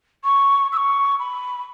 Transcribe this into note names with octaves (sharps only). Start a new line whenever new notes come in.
C#6
E6
C#6
B5